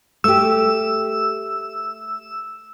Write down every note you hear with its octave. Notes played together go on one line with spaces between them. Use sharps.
A3 G4 E6